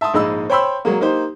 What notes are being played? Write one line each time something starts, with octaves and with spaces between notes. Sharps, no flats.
E5 A5 C6 D#6
A#1 G#2 G#3 D#5 B5 E6
C5 C#5 G5 B5 C6 E6
F#3 G#3 A#3
A#3 D#4 G4 C5